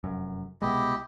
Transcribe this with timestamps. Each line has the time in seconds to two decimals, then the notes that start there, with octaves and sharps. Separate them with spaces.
0.04 F1 F#2
0.62 C2 B2 G#3 E4 G4 D#5